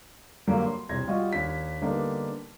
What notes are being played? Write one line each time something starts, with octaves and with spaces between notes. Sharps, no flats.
G2 D3 F#3 G3 A#3
C6
E1 C2 C6 G#6 A#6
G3 F4 F#4 D#5
D#2 D4 B6
D3 G3 A#3 B3 D4 D#4